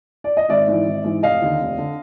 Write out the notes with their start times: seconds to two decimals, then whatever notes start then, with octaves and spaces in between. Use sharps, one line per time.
0.24 D5
0.37 D#5
0.49 G#1 D5 E5
0.67 G#2 E3
0.86 G#1
1.04 G#2 E3
1.22 F1 D#5 F5
1.42 D#2 D3
1.60 F1
1.78 D3